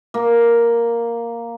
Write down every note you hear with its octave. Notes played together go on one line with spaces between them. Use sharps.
A#3